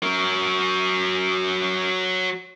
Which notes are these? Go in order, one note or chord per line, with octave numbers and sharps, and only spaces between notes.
F#3 A#4